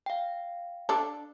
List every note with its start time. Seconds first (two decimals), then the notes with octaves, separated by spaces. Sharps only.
0.06 F5 G5
0.89 D4 A4